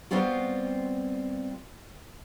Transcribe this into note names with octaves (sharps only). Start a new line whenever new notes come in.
G3 B3 C4 F4 F#4